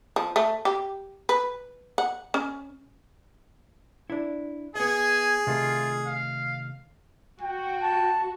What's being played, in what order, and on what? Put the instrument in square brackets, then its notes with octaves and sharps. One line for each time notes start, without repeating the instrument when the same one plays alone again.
[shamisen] F3
A3
G4
B4
F#5
C#4
[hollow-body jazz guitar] D4 E4
[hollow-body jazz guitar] B3 D#5 [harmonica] G#4 [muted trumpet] G#5
[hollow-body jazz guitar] C3 D#3 A3 [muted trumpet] F4
[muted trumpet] F5
[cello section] F#4 [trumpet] G5
[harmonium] A5